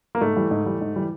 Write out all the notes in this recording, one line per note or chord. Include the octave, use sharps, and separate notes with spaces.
A#3
G#2 A3
E3 G3
G#2
E3 G3
G#2
E3 G3